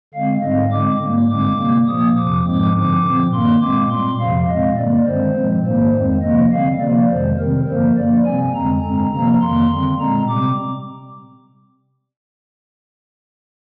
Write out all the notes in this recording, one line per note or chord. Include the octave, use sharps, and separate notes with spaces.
D3 G#3 C4 F5
G#2 G3 C4 D#5
D3 G#3 C4 D6
G#2 G3 A#3
G2 D3 G#3 C4 D6
C3 G3 A#3
A#2 F3 A#3 D#6
F2 C3 F3 D6
G#2 F3 G#3 C4 D6
G2 D3 F3 C4 D6
A#2 F3 C4
G2 D#3 A#3 C6
A#2 G#3 C4 D6
A#2 G3 C4 C6
F2 C3 F3 F5
A#2 G#3 C4 D#5
G2 D3 G3 A#3 D5
G2 D#3 G#3 C4 C5
A#2 F3 G#3 C4
G#2 D#3 G3 A#3 C5
F2 D#3 G#3 C4
C3 F3 A#3 D#5
D3 G3 C4 F5
C3 F3 A#3 D5
F2 C3 D#3 G#3 C5
C3 D#3 G3 C4 A#4
G2 D3 F3 A#3 C5
G2 F3 A#3 D5
C3 G3 C4 G#5
F2 D3 G#3 C4 A#5
G2 D3 G#3 C4
C3 F3 A#3 A#5
F2 D#3 A#3 C6
D3 G3 C4
A#2 G#3 C4 A#5
C3 G3 C4 D6